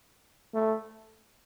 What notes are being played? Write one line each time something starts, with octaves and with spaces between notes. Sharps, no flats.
A3